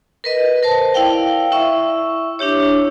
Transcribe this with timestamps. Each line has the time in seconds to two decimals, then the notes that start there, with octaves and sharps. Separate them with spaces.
0.24 A#4 B4 D#5
0.63 A#4 C5 A5
0.94 E4 D5 F5 G5
1.52 E4 E5 C#6
2.39 D4 E4 G4 C#5